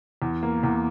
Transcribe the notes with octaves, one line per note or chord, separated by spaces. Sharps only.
E2
A#3
E2